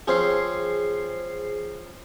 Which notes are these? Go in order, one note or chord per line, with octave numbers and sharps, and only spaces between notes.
F3 C4 C#4 G#4 C5 C7